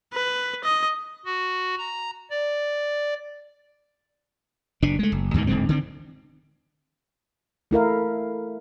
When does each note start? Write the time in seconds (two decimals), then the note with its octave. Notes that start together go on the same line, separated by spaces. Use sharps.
0.13 B4
0.64 D#5
1.25 F#4
1.78 A#5
2.30 D5
4.82 F#1 B2 D4
4.99 G#3 A3
5.12 F#1
5.34 D2 G#2 B2 D#3
5.47 D1 G#2 D3 C4
5.69 D3 D#3 C4
7.71 A3 E4 A#4 F5